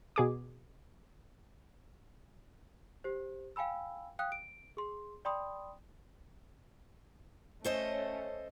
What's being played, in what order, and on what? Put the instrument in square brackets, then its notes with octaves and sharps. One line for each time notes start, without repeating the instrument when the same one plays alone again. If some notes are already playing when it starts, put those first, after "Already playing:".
[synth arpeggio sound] B2 G#4 D6
[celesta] G4 C5
F5 G5 G#5 B5 E6
F5 G5 D#6 F#6
D7
G#4 C6
D5 G5 B5 C6 D#6
[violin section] A3 C#4 [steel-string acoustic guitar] A4 C5 D#5